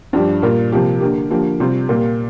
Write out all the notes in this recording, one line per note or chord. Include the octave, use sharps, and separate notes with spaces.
G2 F3 D4 G4
A#2 G3 A#3 F4
C3 F3 A#3 G4
D3 A#3 G4
D3 F3 A#3 G4
C3 G3 C4 F4
A#2 A#3 G4